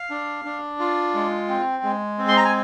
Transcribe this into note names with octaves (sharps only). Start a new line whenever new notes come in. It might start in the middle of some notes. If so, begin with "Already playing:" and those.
Already playing: F5
D4
D4
F4
G#3
C4
G#3
C4
C6
A#5
G#5